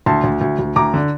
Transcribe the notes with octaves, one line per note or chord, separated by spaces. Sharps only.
D2 A5 C6
D2
D2
D2
D2 A#5 D6
D3